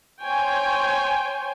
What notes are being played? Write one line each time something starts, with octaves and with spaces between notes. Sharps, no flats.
C5 C#5 G5 G#5